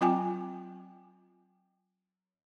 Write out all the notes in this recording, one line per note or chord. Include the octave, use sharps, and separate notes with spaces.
F#3 C4 F4 G5 G#5 D6